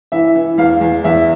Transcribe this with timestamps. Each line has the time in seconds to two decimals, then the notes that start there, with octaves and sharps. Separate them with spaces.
0.12 E3 E5
0.36 E3
0.58 E2 F5
0.81 E2
1.04 E2 E5